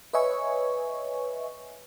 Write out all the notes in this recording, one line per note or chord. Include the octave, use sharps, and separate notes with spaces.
B4 C#5 D#5 E5 G#5 C#6